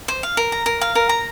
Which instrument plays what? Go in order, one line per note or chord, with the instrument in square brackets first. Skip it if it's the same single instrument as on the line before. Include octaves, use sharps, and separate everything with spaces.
[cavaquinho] C5
F5
A#4
A#5
A#4
F5
A#4
A#5